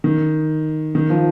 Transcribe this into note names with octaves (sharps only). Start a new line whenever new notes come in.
D#3
D#3
F3